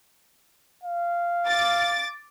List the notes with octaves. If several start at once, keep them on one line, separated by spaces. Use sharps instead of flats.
F5
D6 A6